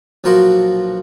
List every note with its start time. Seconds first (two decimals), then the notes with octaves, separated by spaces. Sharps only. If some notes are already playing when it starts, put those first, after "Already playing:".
0.24 B1 A#2 F3 F#4 A#4 C6